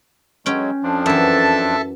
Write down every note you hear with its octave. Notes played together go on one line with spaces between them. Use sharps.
F#3 G#3 C#4 G5
F2 F3 D4
F#2 E3 A4 E5 A5